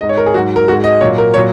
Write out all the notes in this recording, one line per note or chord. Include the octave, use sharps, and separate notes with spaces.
G#2 G#3 D#5
C#5
A#4
G#4
G#2 F#3 F#4
A#4
G#2 G#3 F#4
D#5
A#2 F#3 C#5
A#4
A#2 F#3 C#5